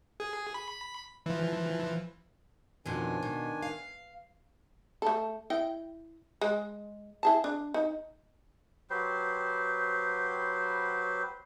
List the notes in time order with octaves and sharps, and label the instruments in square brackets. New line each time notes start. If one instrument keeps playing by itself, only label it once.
[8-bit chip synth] G#4
B5
E3 F3
[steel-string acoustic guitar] F2 B2 F3 [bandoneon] D#3 D4 G#5
[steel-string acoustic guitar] B2
F5
[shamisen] A3 A4
E4 D#5 G5
G#3
E4 G#4 A5
D4
D#4
[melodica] F#3 G4 B4 C5